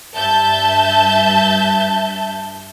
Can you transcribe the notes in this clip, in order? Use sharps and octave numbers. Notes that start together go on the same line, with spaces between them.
G2 E5 A5 G6